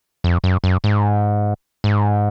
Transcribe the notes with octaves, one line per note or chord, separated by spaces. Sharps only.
F2
F#2
F#2
G#2
G#2